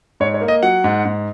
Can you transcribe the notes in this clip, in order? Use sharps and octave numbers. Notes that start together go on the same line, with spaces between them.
G#2 C#5
C#5
A#3
D#5
F#3 F#5
G#2
G#2